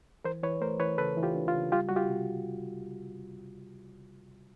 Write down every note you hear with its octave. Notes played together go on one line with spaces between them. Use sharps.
E3 A#4 C5
E3 B4 C#5
A3 A#4 C5
E3 B4 C#5
C#3 A4 B4
E3
F4 G4
D4
F4
C#3
G3 F4 G4
G3 F#4
F4 G4
C3